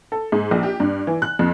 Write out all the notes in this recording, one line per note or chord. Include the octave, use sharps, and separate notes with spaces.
A4
G#2
A#1
G4
G2
E3
F#6
F2